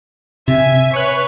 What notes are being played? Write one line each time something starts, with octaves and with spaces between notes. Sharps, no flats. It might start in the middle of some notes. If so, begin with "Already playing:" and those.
C3 E5 G#5
B4 C#5 C#6 F#6